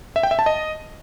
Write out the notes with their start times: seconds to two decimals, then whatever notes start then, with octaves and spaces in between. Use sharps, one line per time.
0.16 E5
0.23 G5
0.31 E5
0.39 A5
0.46 D#5